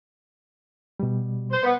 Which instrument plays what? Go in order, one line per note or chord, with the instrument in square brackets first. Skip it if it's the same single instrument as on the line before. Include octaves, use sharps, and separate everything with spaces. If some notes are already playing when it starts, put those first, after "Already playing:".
[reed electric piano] B2 G3
[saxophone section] C5
B3